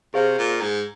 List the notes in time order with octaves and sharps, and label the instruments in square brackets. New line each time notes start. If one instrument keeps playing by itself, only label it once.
[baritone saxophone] C3 [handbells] G#4 C5 F5
[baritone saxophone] A#2
G#2